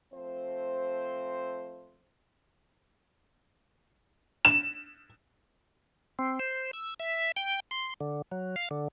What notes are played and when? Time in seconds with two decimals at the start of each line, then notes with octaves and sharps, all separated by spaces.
0.14 F3 A3 C4 C5
4.45 E7
6.19 C4
6.39 C5
6.73 E6
6.99 E5
7.36 G5
7.71 C6
8.00 D3
8.31 F#3
8.56 F5
8.71 D3